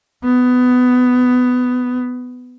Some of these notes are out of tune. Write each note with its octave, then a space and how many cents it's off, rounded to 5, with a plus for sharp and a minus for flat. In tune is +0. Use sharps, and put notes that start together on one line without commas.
B3 +15